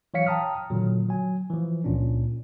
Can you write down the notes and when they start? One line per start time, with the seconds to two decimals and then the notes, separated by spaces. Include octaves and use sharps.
0.14 E3 F#3 C#5 F5 B6 C#7
0.27 G5 A5 A#5 D#6 F6
0.70 A#2 D3 D#3 F#3
1.09 F#3 G#5
1.50 E3 F3
1.84 C#2 A#2 C#4 D4